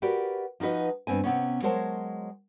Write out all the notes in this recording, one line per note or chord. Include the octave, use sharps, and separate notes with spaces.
F#4 G4 A#4 B4 D5
F3 D#4 F#4 B4 D#5
G2 B3 C4 G#5
C3 E3 B3 C#4
F#3 G#3 A#4 C5 C#5 A5